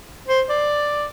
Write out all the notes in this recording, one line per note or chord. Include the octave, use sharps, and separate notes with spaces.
C5
D5